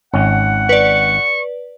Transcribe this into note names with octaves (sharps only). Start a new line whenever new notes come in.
G#1 C#4 F#5
B4 D5 C#6